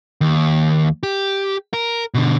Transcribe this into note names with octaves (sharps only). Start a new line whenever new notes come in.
D#2
G4
A#4
B2 D3